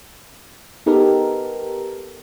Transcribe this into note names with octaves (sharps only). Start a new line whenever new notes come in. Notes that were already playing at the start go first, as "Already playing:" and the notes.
B3 D#4 G4 A4 A#4